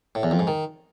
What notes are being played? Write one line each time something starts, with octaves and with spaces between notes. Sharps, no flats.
A2
E2
F2
G#2
D#3